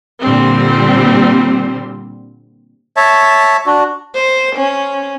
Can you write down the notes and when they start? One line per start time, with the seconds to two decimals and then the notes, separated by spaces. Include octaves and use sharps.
0.20 A#2 D3 G3 C4
2.97 C#5 E5 A5
3.66 D4 F#4
4.15 C5
4.56 C#4